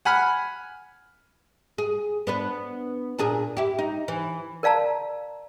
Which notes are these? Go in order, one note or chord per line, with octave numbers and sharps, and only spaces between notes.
F#5 G#5 B5 F6
G#4
B3 D4 B4
A#2 D4 G#4
E4 G4
D#4
E3
A#4 D5 F5 A5 A#5